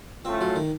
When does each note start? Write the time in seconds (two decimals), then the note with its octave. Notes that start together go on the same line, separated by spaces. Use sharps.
0.25 A2 A3 C4 C#4 F4
0.41 F#3
0.56 D#3